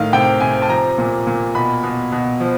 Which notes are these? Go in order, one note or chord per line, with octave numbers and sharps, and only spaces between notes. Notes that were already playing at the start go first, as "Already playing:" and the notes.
Already playing: A2 D#3 F5
C3 G5
C3 G#5
A5
F3 A#5
A#2
A#2
B2 B5
B2
B2
F3